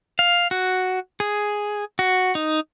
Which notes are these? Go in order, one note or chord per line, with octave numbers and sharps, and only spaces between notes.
F5
F#4
G#4
F#4
D#4